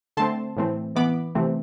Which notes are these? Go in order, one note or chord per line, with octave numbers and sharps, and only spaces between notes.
D3 A3 C4 A5 C6
A2 E3 A3 C4
E3 B3 B5 D6
C3 E3 A3 C4